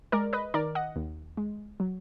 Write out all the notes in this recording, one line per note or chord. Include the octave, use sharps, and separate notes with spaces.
G#3 A#4 D5
B4 D#5
D#3 A#4 D5
D#5 F#5
D#2
G#3
F#3